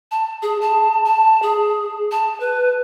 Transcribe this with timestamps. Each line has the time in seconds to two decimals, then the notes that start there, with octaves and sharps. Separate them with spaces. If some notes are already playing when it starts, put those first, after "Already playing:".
0.11 A5
0.42 G#4
0.61 A5
1.05 A5
1.42 G#4
2.11 A5
2.40 B4